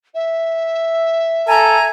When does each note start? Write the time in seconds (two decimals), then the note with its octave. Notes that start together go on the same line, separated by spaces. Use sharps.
0.14 E5
1.48 A4 G#5 A#5